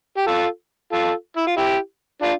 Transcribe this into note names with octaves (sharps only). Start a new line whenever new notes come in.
G4
F4 A4
F4 A4
E4
F4
E4 G4
D4 F4